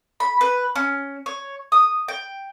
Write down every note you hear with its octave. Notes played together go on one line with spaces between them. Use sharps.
B5
B4
C#4
C#5
D#6
G5